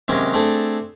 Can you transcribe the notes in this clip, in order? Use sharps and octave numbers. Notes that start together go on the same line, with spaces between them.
D#2 C3 F#3 G#3 C#4 G4
A3 C4 D4 G#4 A4